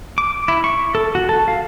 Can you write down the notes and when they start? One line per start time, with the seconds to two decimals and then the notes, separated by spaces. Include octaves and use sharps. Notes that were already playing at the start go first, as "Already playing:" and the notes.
0.18 D6
0.48 E4
0.64 C#6
0.95 A4
1.15 F#4
1.29 A4
1.48 F5